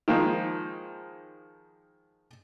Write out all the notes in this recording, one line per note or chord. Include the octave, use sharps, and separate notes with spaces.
D#3 F3 G#3 A#3 D#4